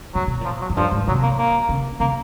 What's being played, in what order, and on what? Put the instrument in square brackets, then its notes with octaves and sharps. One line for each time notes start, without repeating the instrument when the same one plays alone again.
[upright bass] A#2 [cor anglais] F#3
[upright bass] B2
[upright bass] A#2 [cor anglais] F3
[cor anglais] F#3
[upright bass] F#2
[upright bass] G2 [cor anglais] F3
[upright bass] G#2
[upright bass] C3 [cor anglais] F#3
[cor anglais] A#3
A#3
[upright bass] C#3
[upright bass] C#3 [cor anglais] A#3